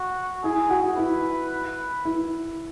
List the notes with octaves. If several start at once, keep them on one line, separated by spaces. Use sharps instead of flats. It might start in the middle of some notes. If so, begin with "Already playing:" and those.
Already playing: F#4
E4 G#4
F#4
E4 B4
E4